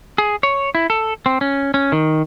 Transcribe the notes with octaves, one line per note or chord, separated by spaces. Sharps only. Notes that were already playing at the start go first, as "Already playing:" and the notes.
G#4
C#5
E4
A4
C4
C#4
C#4
D#3